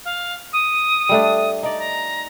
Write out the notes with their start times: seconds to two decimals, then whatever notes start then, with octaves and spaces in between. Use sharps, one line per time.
0.04 F5
0.52 D#6
1.09 G3 A3 D4
1.63 D#4 D5
1.78 A#5